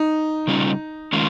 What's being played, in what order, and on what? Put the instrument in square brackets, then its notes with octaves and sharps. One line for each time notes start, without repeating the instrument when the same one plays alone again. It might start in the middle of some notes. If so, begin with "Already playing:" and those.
Already playing: [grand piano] D#4
[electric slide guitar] C#3 G3 C#4 F4
D#3 G#3 C#4 F4